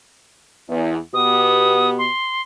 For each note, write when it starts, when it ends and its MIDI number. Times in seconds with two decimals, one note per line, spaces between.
0.69 0.97 40
1.14 2.07 47
1.14 2.07 59
1.14 2.07 67
1.14 1.90 87
1.98 2.42 84